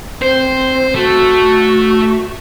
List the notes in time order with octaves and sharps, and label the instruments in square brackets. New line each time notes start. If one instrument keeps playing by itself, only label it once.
[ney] C4 [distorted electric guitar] C5
[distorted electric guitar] A3 [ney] F#4